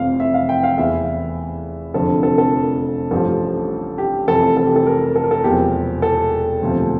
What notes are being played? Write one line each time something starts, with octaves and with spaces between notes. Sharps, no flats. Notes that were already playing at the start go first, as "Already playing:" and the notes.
Already playing: F1 F2 E3 F5
E5
F5
G5
F5
E2 E3 E5
F1 F2 D3 F3 A4
A4
A4
A1 G2 F3 A4
G4
F1 F2 C3 E3 A4
A4
G4
A4
A#4
A4
A#4
A4
E1 E2 C3 F3 G4
A4
E1 D2 C3 F3